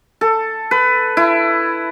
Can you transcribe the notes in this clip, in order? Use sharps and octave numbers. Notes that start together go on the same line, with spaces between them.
A4
B4
E4